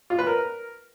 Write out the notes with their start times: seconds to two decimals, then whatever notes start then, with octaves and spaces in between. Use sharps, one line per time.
0.10 F4
0.19 B4
0.27 A#4